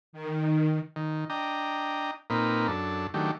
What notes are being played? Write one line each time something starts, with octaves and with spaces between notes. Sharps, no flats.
D#3
D#3
D4 D#5 G5 A#5
A#2 A#3 C4 D#4 B4
F#2 D4 A4
D#3 F#3 A3 D4 G4